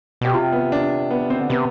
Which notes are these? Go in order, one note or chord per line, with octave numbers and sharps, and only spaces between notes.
B2 G4
C3 F4
B3
D4
B3
C4
D3
C3 B3